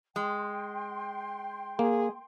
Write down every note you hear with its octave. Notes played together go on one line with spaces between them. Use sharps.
G#3 G5 C6
A#3 G#4